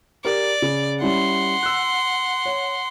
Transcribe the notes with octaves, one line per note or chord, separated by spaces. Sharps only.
G4 A#4 D5
C#3
G3 C#4 E4 F#5 C6
E6 F#6
C#5